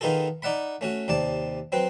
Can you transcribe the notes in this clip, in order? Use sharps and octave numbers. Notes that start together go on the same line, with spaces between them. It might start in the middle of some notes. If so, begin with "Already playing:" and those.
D#3 B3 D#4 F4 G#4 A4
D#4 D5 E5 F#5 B5
A3 C#4 F#4
D#2 C3 D5 A5
F#3 C4 B4